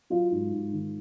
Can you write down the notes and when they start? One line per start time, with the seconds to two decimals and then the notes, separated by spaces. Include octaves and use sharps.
0.10 F#3 F4
0.31 G#2
0.52 G#2
0.72 D#3